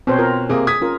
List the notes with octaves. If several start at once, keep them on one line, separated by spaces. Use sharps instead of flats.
B2 C4 C5 C#5
F4 A#4
C3 A#3 G#4
D#6 G#6 B6
C#4 F4 A#4